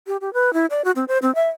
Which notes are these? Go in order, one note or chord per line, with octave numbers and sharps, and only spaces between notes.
G4
G4
B4
E4
D5
F#4
C4
C5
C4
E5